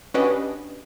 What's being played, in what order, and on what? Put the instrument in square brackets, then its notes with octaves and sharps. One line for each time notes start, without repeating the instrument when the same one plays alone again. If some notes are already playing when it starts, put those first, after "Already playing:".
[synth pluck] C#4 D4 F#4 G4 B4 D#5